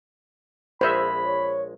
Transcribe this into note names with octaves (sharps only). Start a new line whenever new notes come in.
A#1 G#3 C5 E5 B5
C#5